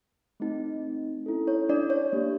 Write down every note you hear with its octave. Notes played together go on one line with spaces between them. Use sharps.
A3 C4 D#4
C#4 E4 A4
C#5
D4 D5
C#5
A#3 D4 G4